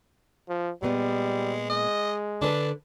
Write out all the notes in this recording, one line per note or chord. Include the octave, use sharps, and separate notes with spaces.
F3
A#2 G3 G#3 B3
G#3 D#5
D3 D4 A4 B4